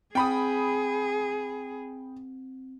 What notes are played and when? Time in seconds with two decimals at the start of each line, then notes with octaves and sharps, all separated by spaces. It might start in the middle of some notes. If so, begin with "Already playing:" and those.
0.15 C4 G#4 G5 B5 D#6